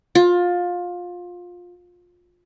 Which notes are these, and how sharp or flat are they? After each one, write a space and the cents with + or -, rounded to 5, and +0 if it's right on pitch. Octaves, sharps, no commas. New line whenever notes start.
F4 +20